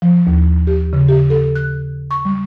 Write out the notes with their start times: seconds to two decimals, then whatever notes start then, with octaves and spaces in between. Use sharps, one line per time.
0.02 F3
0.27 D#2
0.67 G4
0.93 C#3
1.08 G4
1.30 A4
1.55 F#6
2.11 C#6
2.25 G3